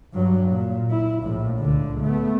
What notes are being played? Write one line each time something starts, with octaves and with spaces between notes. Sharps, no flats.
G2 F#3
A#2
E4
A#1 A2
C#2 D3
A3 B3